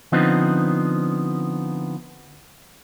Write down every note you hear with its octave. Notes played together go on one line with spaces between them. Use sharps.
D3 F3 B3 C4 D#4